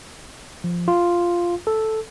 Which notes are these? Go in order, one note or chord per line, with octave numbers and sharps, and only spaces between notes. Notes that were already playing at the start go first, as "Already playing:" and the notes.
F3
F4
A4